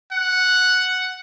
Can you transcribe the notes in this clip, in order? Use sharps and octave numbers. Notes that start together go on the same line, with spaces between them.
F#5